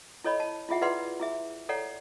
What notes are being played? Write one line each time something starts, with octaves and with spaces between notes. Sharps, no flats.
E4 A4 C#5 D#5 B5
A5
E4 F4 G#4 E5 F#5
E4 G#4 B4 D5 F#5 C6
E4 G#4 E5
A4 C#5 D5 F#5 A#5